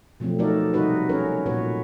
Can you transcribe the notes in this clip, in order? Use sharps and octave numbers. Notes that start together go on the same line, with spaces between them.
B2 F3 F#3 A3 C4
A3 D#4 F#4 A4 A#4 D5
C3 G3 D#4 F#4 B4
C#4 A#4 B4 C#5
A#2 F#4 B4 C#5